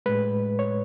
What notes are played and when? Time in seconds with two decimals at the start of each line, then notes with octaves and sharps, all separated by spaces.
0.06 A2 G#3 B4
0.59 C#5